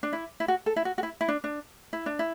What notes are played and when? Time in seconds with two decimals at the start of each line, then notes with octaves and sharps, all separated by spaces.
0.03 D4
0.13 E4
0.40 E4
0.48 F#4
0.66 A4
0.76 E4
0.85 F#4
0.98 F#4
1.03 E4
1.21 E4
1.28 D4
1.44 D4
1.93 E4
2.06 D4
2.19 E4